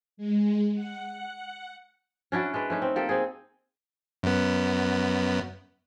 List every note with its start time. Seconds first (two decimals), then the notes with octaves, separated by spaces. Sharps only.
0.17 G#3
0.74 F#5
2.32 C#4 D4 E4 F#4
2.54 G#3 D4 B4
2.70 A3 C#4 D#4
2.82 C4
2.96 A#3 G4 A4
3.09 C4 G#4
4.23 F#2 B3